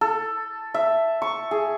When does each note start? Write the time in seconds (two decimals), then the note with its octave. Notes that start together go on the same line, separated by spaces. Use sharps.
0.01 A4
0.74 E5
1.22 C#6
1.51 G#4